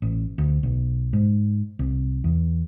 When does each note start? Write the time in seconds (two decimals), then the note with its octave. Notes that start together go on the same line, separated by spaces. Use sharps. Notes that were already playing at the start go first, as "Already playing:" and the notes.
0.02 A1
0.38 D2
0.63 B1
1.13 G#2
1.79 C2
2.24 E2